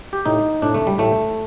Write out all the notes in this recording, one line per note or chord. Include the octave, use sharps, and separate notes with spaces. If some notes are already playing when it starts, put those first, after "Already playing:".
G4
A2 D#4
A2 D4
A3
G3
A2 A3